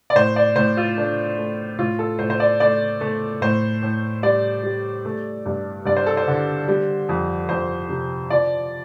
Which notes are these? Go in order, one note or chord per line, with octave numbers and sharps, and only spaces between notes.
D5
A2 C5
D5
A2 C5
F4
A3 D4
A3
A2 F4
A4
A2 C5
C5
D5
A3 D5
A3
A2 C5
A2
G3 D5
G3
A3
G2
G2 D5
C5
A4
C5
D3
G3
F2
F2 C5
C3
F3 D5